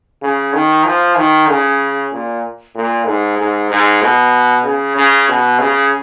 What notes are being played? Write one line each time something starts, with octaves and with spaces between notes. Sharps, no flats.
C#3
D#3
F3
D#3
C#3
A#2
A#2
G#2
G#2
G#2
B2
C#3
C#3
B2
C#3